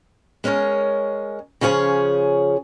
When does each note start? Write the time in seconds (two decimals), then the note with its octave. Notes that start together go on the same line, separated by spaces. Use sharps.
0.44 G#3 C#4 A#4 C#5
1.61 C#3 F3 C#4 G#4 C#5